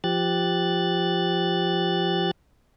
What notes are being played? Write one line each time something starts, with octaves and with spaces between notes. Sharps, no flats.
F3 G4 F#6 A6